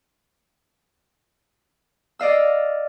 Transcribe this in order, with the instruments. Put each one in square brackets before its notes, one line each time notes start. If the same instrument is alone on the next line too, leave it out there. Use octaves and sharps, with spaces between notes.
[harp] D5 D#5 F5 E6